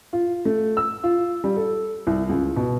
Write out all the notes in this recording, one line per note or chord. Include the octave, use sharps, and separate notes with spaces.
F4
A3
E6
F4
G3
A4
C2
C#2
B2